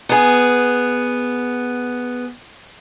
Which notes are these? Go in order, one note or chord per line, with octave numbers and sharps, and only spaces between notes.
B3 G#4